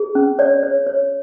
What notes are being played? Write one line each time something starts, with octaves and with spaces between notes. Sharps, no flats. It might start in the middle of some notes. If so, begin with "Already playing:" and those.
Already playing: G#4
C#4
C#5 D5
C#5
C#5